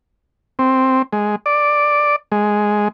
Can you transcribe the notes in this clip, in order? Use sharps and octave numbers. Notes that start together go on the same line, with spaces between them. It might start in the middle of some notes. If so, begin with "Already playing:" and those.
C4
G#3
D5
G#3